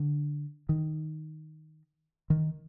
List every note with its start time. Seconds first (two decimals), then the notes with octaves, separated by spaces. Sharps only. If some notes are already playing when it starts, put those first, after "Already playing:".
Already playing: D3
0.69 D#3
2.30 D#3